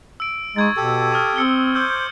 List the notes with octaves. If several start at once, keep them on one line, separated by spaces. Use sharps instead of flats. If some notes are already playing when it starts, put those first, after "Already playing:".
E6 D7
G#3 D#4 C#6 G#6 A6
B2 G4 A4
C#6 D#6 F6
C4 E6 C#7 G7
C5 D6 E6 G6